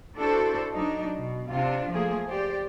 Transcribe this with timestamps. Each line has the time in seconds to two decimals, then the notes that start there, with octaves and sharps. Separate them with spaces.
0.18 D4 E4 F#4 A4 C5
0.74 F#3 D4 D#4
1.17 B2
1.50 C3 D4 F4
1.90 F3 A3 A#3 G#4
2.29 G4 C5 D5